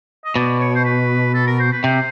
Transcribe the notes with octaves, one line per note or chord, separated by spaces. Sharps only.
D#5
B2 D5
C#5
C5
B4
A4
A#4
C5
B4
C3 C5